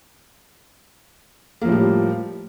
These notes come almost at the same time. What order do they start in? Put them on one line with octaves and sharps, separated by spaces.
A#3 F3 A2 G3